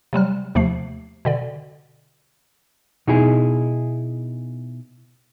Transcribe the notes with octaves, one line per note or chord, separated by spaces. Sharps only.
C3 F#3 G3 F6
D#2 C3 F3 A3 C7
B2 D3 D5
B2 D#4 E4 G#4